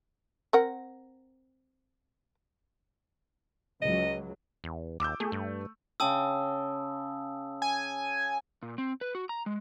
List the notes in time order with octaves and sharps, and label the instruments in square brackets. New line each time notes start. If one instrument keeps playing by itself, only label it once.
[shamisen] C4 A#4 F#5
[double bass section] C#2 F#3 [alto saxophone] D#5
[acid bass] E2
[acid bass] D#2 [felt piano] D6 E6 G6
[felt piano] A3 [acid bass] G#4
[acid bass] G2
[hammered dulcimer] C#3 G5 [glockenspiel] A5 D#6 E6
[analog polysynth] G#5
[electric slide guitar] A#2
C4
B4
F#4
A#5
G#3